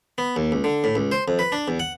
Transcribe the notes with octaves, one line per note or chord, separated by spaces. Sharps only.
B3
D#2
C#2
D3
A2
C#2
C5
F2
B4
D4
E2
F#5